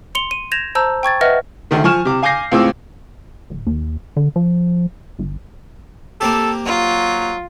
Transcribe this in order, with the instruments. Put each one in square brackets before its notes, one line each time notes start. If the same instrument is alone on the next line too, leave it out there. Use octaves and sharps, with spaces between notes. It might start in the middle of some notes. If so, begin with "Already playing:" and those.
[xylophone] C6 C#7 F7 G7
D#7
G6 G#6 A#6 E7 F7
C5 A5 A#5 E6 G6
G5 C#6 G#6 A6
B4 D#5 E5 F#5 F6 A#6
[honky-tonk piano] D2 D#3 A3
F3 G#5 C#6 F6 E7
C3 D6
F5 G#5 D6 G6 A#6 C7
C#2 A2 C4 F4 D6 E6
[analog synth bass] D1
D#2
D3
F3
G1
[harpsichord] A#3 C4 G4 [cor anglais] A4
[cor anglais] F#3 [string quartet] F4